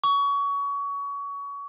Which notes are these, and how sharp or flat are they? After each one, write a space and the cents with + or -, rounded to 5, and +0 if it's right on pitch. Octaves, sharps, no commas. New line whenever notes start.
C#6 +25